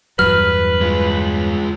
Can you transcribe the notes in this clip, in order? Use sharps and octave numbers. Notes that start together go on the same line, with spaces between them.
E2 G2 F#3 B4 F6 F#7
G#3 F4